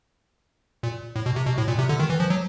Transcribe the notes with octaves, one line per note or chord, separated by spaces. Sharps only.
A#2
A2
B2
C3
B2
A2
A#2
C3
D3
D#3
E3
F3
F#3